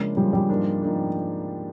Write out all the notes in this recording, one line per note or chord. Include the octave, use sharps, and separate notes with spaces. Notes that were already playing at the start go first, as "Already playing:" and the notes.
Already playing: C#3 F3 G#3 A#3 D4
C#3 F3 G3 A#3 D4
G3
G#2 F3 A#3 D4
G#2 F3 A#3 D4